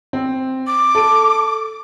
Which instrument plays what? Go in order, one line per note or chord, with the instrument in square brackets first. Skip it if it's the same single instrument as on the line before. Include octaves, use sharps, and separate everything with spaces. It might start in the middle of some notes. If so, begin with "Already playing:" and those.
[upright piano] C4
[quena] D6
[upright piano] A4 D7